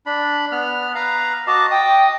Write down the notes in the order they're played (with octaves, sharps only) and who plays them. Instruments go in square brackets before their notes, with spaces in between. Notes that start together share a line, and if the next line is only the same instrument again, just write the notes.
[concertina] D4 B5
B3 F6
B4 F5 A#5
[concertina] F#4 D#5 A5 [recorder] D6
[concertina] D#5 D#6 [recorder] G5